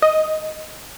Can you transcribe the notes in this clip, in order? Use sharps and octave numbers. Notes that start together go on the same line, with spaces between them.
D#5